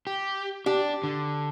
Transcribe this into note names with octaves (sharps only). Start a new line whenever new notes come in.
G4
D4 G4
D3